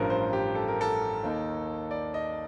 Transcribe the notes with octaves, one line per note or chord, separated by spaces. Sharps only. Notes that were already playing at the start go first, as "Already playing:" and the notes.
Already playing: A1 G2 F3 A#4
C5
G4
A4
A#4
A4
D#2 D#3 A#3 D#4
D5
D#5